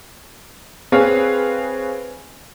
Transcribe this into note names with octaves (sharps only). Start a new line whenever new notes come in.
C4 G#4 B4 C#5 F5